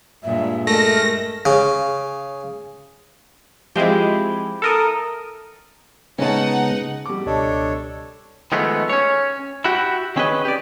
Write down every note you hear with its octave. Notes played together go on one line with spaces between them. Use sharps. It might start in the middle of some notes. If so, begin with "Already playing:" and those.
G2 A#2 G#3 E5
G#3 A3 A#4 A#6
C#3
F3 G#3 C4 E4 G4
A4 A#4 D#6
C#3 G#3 B3 C#4 D#4 F#5 A5
G3 D6
C#2 B2 D4 A4 C#5 D#5
D#3 F3 G#3 A3 B3
C#4 C#5
E4 F#4 G4
D#3 C4 C#4 G#4 B4 D#5
G4 D5